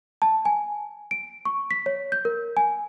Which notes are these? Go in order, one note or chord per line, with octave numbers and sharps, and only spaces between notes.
A5
G#5
D7
C#6
B6
C#5
G6
A#4
G#5